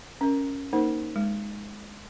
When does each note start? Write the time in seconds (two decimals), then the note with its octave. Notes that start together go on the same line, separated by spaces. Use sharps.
0.21 C#4 A#4
0.73 A#3 D#4 A#4 C5
1.16 G#3